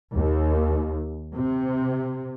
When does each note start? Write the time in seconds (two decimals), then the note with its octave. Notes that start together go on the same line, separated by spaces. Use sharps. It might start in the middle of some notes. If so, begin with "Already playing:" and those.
0.13 D#2
1.35 C3